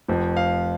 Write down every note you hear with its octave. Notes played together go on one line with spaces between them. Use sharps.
F1 F2 F3
F5